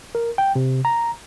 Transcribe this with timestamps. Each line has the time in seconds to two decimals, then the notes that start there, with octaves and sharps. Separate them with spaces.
0.15 A#4
0.38 G5
0.55 C3
0.85 A#5